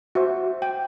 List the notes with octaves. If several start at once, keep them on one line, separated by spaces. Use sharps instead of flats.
F#4 C5 E5
G5